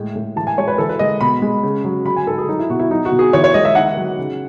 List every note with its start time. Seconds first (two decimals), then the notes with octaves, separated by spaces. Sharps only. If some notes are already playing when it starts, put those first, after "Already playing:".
Already playing: A2 G#3
0.15 A2
0.36 E3 A5
0.47 G#5
0.58 G#3 C#5
0.68 B4
0.78 E3 A4
0.89 B4
0.99 G#3 D#5
1.21 B2 B5
1.42 G#3
1.63 C#3
1.84 F#3
2.05 F#3 B5
2.16 G#5
2.27 G#2 A4
2.38 G#4
2.49 F#3 D#4
2.59 E4
2.70 B2 F#4
2.80 E4
2.91 F#3 D#4
3.05 F#4
3.12 B2
3.19 G#4
3.33 E3 C#5
3.44 C#5
3.54 G#3 D#5
3.65 E5
3.75 D#3 F#5
3.97 F#3
4.19 C#3